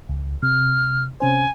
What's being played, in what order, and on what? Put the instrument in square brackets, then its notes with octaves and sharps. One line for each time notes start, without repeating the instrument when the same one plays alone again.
[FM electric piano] C#2
[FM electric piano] C3 [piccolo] F6
[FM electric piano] C3 C#4 C5 [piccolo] G#5